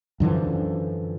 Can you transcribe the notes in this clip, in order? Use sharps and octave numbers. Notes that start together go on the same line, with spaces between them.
F#2 D3 E3 F3